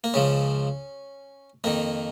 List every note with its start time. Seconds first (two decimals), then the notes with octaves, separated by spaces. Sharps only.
0.04 A#3
0.14 C#2 C#3 F3 C#4
1.64 F2 D#3 A#3